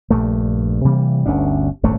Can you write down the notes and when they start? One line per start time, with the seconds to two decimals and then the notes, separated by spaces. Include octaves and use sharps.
0.10 A#1 G2 A3
0.84 C3 E3 G3 A#3
1.26 G1 D2 C#4 D4
1.83 D#1 G#1 D3 A3